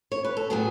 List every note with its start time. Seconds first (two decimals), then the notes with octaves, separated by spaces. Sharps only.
0.12 C#5
0.25 B4
0.37 A4
0.50 A2 F#3 B3 G#4